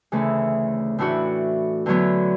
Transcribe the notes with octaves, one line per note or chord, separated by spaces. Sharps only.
D2 C#3 E3 A3
A2 E3 A3 D4 F#4
E2 D3 F#3 B3